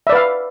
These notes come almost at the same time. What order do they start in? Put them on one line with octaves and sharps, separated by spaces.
E5 D5 B4 F5